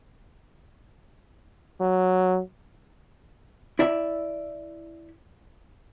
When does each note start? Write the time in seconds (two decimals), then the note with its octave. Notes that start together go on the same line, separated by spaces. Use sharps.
1.80 F#3
3.79 E4 D5 E5